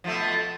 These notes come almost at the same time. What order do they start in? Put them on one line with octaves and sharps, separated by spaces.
F3 A3 B2